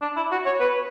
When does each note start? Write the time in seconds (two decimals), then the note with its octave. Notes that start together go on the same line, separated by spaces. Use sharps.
0.01 D4
0.17 E4
0.31 F#4
0.46 C#5
0.60 B4